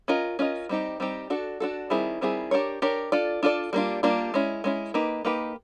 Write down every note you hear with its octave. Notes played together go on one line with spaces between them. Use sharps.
C#4 F4 A#4 D#5
C#4 F4 A#4 D#5
G3 C4 D#4 G4
G3 C4 D#4 G4
D4 F#4 A4
D4 F#4 A4
D#3 G3 C4 E4 G#4
D#3 G3 C4 E4 G#4
D4 G4 A#4 C#5
D4 G4 A#4 C#5
D4 F4 A4 D5
D4 F4 A4 D5
G3 A#3 D4 F4
G3 A#3 D4 F4
G#3 C#4 E4
G#3 C#4 E4
A#3 D#4 G4 B4
A#3 D#4 G4 B4